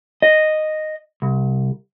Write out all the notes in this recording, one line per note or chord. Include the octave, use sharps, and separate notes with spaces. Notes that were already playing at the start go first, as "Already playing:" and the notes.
D#5
C2